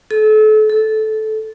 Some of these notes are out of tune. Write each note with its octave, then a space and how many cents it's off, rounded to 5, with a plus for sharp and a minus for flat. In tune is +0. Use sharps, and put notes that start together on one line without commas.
A4 -35
A4 -15